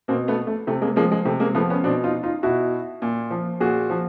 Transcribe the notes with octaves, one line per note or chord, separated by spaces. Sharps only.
B2 A#3 C4
A3 B3
A3
C3 A3
G#3 A#3
F3 G#3 A#3
G#3
C3 A3
G#3 A#3
F3 A3 B3
B3 C#4
B2 C4 D4
D#4 F4
D#4 F4
B2 E4 F#4
A#2
F3
A#2 F#4 G#4
F3